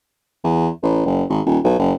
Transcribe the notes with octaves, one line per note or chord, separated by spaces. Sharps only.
E2
A1
F#1
G#1
D#1
B1
F#1